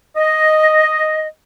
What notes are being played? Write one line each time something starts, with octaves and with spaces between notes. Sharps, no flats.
D#5